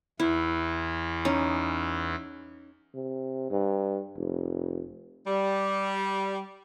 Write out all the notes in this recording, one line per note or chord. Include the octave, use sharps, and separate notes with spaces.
E2 E3 E4
C#4 D#4
C3
G2
F1
G3